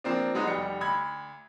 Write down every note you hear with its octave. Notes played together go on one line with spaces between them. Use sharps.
F3 A#3 C4 D4
F#3 G#3 B3 D#4
F1 G3 C#7
D2 B5 G#6